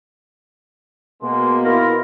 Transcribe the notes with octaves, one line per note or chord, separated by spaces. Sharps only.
B2 G#3 A#3 C6
E4 F4 A#4